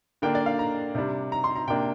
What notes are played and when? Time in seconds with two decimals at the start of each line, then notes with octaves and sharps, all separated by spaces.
0.22 D3 A#3 D4 G5
0.35 D5
0.46 F5
0.59 A#5
0.95 C3 G3 D4
1.32 A#5
1.44 C6
1.56 A#5
1.67 C3 A#3 D4 G5